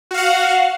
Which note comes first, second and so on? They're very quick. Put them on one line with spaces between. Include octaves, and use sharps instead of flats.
F#4 F5 F#5